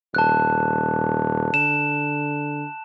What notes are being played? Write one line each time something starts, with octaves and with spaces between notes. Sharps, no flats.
D#1 A5 F#6
D3 E7